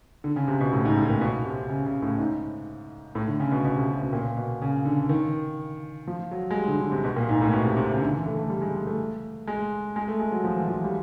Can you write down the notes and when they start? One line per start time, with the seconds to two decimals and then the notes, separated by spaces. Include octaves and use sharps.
0.24 D3
0.36 C#3
0.48 C3
0.60 B2
0.73 A2
0.85 G#2
0.97 A2
1.10 A#2
1.21 B2
1.45 C3
1.69 C#3
1.86 C#3
2.02 A2
2.18 G#2
3.15 A2
3.28 D3
3.40 C#3
3.51 B2
3.65 B2
3.76 C3
3.89 C3
4.01 B2
4.13 A#2
4.37 B2
4.62 C#3
4.85 D3
5.09 D#3
6.07 F3
6.31 F#3
6.51 G#3
6.56 G3
6.68 D3
6.80 D3
6.92 C3
7.04 B2
7.16 A#2
7.29 G#2
7.41 A2
7.52 B2
7.65 C3
7.77 C3
7.89 C#3
8.01 D3
8.13 E3
8.26 A3
8.38 A3
8.50 G3
8.62 G#3
8.75 G#3
8.87 A3
9.48 G#3
9.96 G#3
10.08 A3
10.19 G#3
10.32 F#3
10.44 F3
10.56 E3
10.68 F3
10.84 G3